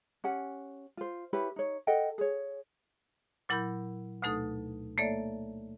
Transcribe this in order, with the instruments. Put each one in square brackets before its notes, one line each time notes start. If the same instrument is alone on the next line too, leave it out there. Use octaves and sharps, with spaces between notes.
[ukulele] C#4 G4 F#5 G#5
F4 C5
E4 G4 B4 C#5
D#4 C#5
A4 D#5 F#5 G5
G#4 C#5
[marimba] A#2 F#3 E4 A#4 B5 G6
D2 B2 A3 D#4 A4 D#6
A3 A#3 A4 C#5 D5 E5